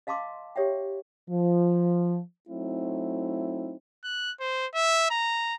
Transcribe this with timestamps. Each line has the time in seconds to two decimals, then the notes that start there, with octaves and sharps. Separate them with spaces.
0.07 D#5 F5 A5 C6 D6 E6
0.56 G4 C#5 E5 G5
1.29 F3
2.50 F#3 A3 C4 D#4 E4
4.04 F#6
4.40 C5
4.75 E5
5.10 A#5